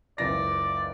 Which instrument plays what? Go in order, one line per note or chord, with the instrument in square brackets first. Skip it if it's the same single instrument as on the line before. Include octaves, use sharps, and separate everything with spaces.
[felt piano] F#1 C#2 A#6 [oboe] D5